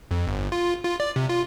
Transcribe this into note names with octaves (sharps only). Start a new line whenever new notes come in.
F2
G1
F4
F4
D5
C3
F4